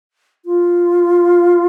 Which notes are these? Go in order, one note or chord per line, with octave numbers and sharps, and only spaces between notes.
F4